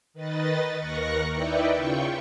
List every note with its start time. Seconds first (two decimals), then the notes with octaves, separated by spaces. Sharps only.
0.14 D#3 B4 D#5 A6
0.77 D#2 A#4 C#6 F#6 A#6 C#7
1.31 D#4 E4 B4 D5 E5 G5
1.75 C#3 F4 G5 C#6